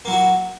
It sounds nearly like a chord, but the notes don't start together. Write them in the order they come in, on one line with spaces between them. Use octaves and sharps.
A#3 F#3 E4 F#4